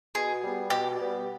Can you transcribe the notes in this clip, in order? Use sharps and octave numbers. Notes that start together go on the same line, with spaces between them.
B2 G#4
G3 B3
B2 G4
G3 B3